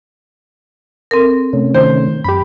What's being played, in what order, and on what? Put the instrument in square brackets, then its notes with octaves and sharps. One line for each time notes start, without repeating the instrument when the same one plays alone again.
[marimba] C4 A4 A#4
[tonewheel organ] C3 A3 C#4
[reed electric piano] D#3 [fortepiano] C5
[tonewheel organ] F#2 [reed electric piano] G4 B5